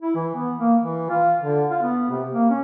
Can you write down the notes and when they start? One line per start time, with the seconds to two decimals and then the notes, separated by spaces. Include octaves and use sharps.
0.02 E4
0.15 E3
0.35 B3
0.58 A#3
0.82 E3
1.09 F4
1.41 D3
1.70 F4
1.82 B3
2.11 C3
2.32 A#3
2.50 C#4